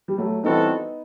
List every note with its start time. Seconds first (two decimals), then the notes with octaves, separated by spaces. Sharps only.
0.08 G3
0.18 F#3 A3
0.43 E3 G3 B3 C4 D#4 F#4 A4